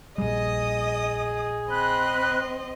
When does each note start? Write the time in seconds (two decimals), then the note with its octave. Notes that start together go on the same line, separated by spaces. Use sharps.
0.18 A#1 G3 G#4 D#5 D#6
1.70 C4 D#5 B5 F#6